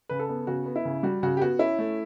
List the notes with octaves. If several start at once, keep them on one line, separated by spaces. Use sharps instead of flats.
C#3 B4
A4
B3
C#3 F#4
B3
E4
C#3
G3 F#4
C#3 F#4
G4
B3 F#4
C#4 E4
A3